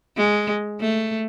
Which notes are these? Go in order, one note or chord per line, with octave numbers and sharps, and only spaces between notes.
G#3
A3